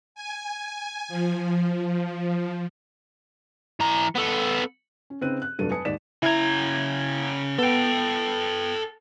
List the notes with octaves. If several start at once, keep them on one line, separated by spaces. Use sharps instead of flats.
G#5
F3
E3 A#5
B3 A4
C#4
C#3 C4 D#4 B4 F#6 D#7
F#6
F1 G2 F#3 A4 D#7
B4 G#5 A5 D#6 C#7
D#2 G#2 D5 B6 E7
C#3 E4 A#5 G#6
B3 A4 G5